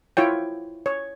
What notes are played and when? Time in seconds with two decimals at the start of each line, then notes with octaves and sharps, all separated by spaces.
0.17 E4 F4 C#5 G5
0.86 C#5